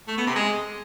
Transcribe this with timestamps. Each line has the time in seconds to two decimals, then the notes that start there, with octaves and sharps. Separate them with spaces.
0.08 A3
0.17 B3
0.27 C3
0.36 G#3